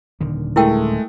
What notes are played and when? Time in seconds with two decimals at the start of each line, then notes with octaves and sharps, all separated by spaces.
0.21 D#1 D3 D#3
0.56 G#3 A3 E4 A#4 G5